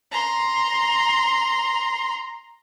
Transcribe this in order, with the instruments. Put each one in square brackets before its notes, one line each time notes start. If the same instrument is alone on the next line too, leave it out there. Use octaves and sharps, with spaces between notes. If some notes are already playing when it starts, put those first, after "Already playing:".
[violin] A#5 C6